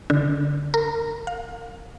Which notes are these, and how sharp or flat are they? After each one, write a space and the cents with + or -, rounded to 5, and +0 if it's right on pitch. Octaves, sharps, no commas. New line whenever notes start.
D3 -15
A#4 -25
F5 +20